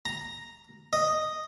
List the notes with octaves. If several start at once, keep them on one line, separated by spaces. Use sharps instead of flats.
A#5
D#5